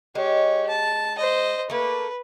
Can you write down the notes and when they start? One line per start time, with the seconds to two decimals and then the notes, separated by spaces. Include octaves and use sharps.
0.15 G#3 G4 C#5
0.68 A5
1.18 C5 D#5
1.70 A3 A#3 B4